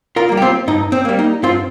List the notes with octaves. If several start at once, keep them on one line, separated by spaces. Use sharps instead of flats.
F4 A#4
G3 A#3
G4
C4 F4
G2 D#4
C4
G3 A#3
D#4
G2 C4 F4